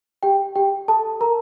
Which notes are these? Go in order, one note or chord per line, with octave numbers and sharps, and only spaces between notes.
G4 G5
G4 G5
A4 A5
A#4 A#5